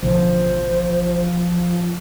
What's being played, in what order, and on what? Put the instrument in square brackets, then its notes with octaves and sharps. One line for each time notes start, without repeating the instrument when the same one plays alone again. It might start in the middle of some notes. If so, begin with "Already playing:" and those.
[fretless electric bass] A1 B2 D3 [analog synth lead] F3 [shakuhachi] C5